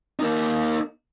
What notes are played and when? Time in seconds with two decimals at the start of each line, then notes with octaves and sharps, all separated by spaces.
0.19 A#3 D#4